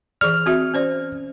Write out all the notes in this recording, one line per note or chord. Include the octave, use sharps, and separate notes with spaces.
E3 G#4 D5 F6
C4 F#4 E5
C#4 C5 D5